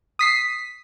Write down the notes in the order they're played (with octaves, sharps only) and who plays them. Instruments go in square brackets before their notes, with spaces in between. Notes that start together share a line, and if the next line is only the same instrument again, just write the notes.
[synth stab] D#6 B6 C7